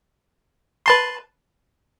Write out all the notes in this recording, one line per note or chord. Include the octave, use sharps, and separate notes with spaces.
B4 A5 C6